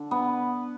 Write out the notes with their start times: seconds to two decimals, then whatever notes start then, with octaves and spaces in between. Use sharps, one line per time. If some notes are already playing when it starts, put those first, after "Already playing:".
Already playing: D3
0.11 B3